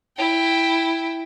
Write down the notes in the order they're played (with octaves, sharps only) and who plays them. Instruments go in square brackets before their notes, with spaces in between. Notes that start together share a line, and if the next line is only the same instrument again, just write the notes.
[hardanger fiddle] E4 G5